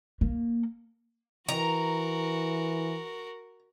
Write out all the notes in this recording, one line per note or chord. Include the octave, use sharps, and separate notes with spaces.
A#3
E3 F#4 A#4 A#5